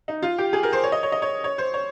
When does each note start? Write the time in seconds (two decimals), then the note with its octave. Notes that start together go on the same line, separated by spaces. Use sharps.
0.08 D#4
0.22 F4
0.38 G4
0.53 G#4
0.63 A#4
0.73 C5
0.84 C#5
0.92 D#5
1.03 C#5
1.12 D#5
1.22 C#5
1.44 C#5
1.58 C5
1.74 C#5